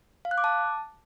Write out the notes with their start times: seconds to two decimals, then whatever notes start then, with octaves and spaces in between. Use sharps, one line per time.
0.25 F5
0.31 F#6
0.38 D6
0.44 A5